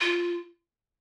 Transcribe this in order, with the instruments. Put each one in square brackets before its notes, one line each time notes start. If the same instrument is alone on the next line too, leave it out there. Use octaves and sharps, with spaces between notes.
[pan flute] F4